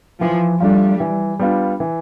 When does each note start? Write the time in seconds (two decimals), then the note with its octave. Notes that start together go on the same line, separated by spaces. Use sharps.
0.21 E3 F3
0.60 G3 A3 D4 F4
1.00 E3
1.39 G3 B3 D4 F4
1.80 E3